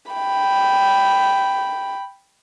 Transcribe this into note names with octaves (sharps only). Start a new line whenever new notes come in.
G5 B5